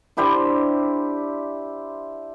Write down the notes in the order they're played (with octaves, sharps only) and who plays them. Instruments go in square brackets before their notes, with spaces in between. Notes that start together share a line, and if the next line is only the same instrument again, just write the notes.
[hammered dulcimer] D4 E4 G4 C5